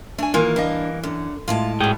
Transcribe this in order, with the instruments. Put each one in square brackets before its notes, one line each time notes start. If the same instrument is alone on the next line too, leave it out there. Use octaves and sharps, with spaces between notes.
[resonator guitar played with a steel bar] A3 G#5 [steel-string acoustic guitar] D4
[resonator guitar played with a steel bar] D#3 F4 G#5 [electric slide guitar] E3 [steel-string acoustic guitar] A#3
[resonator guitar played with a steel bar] G3 A#3 D#5 [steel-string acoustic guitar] D4
[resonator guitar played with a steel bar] F#2 [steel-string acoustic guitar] D3
[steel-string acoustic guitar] A2 G#3 A5 [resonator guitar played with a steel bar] F4
[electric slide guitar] G#2 G#4 G5 [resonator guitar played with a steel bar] B2 G3